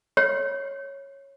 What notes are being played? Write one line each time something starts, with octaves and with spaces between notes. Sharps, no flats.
C#5